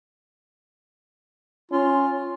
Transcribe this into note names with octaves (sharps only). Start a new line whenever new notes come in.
C#4 F4